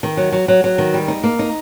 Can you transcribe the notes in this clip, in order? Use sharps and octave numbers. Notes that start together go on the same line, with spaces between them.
D#3
F#3
F#3
F#3
F#3
D#3
G3
D#4
A#3
D#4